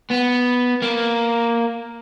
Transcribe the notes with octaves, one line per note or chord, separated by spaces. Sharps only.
B3
A#3